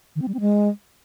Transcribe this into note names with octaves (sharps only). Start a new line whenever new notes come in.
D#3
C4
G3
C4
G#3